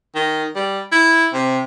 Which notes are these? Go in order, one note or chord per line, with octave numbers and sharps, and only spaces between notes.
D#3
G3
E4
C3